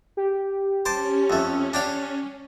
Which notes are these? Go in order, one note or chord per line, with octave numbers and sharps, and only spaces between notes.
G4
C#4 C5 A5 D6
F2 A3
D4 G4 F5